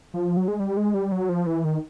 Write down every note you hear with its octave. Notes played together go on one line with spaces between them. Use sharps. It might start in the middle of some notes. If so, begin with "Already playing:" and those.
F3
F#3
G#3
G3
G#3
G3
F#3
F3
E3
D#3